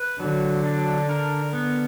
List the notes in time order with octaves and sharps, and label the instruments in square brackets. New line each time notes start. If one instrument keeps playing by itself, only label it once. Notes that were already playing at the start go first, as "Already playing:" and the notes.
Already playing: [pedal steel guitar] B4
[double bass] D3 [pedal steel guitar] F#3
[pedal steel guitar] D4
A#4
B3